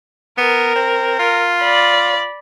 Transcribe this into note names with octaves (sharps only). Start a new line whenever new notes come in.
B3 A#4
C4
F4
D5 B5